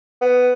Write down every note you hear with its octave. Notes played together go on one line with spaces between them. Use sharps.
B3